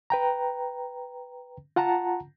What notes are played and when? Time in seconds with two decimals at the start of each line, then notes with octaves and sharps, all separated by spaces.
0.10 B4 G5 A#5
1.76 F4 F#5 A5 A#5